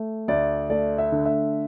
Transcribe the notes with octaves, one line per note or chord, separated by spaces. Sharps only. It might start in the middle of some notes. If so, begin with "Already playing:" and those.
Already playing: A3
D2 D5
A3 D5
E5
D3
E5